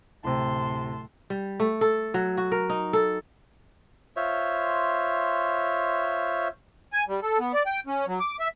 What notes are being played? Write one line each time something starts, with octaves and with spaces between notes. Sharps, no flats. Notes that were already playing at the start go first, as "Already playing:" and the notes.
D1 C3 A5 C6
G3
A3
A4
F#3
F#4
A#4
D#4
A4
F4 C5 C#5 E5
G#5
G3
A4
B3
D5
G5
C#4
F#3
D6
E5